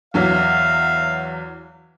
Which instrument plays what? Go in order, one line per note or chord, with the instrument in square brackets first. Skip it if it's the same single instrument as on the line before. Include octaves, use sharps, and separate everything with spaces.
[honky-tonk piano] E2 E3 F#3 [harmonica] E5 F5